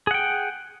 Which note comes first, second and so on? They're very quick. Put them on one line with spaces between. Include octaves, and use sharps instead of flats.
G#4 F#5 G5